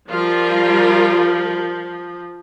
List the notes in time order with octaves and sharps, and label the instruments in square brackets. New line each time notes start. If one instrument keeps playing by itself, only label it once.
[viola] F3 [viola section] G3 F4 A#4